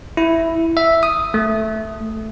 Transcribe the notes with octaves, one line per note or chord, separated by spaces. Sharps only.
E4
E5
D#6
A3